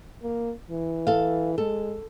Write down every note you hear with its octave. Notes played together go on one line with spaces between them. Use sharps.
A#3
E3
A4 F5
G#3 A4